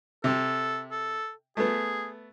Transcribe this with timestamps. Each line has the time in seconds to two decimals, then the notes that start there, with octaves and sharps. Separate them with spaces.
0.24 C3 A4
0.91 A4
1.57 A3 B3 G#4